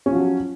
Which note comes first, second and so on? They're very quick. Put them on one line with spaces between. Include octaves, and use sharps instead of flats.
C#4 F3 F#3